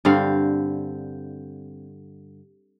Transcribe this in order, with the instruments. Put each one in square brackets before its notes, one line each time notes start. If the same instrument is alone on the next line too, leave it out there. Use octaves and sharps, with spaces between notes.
[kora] G2 D3 C4 F5